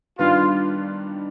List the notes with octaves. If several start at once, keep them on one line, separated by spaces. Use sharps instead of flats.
G2 D#3 G3 B3 D4 F4